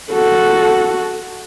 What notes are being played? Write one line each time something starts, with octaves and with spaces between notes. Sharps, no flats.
F#4 A4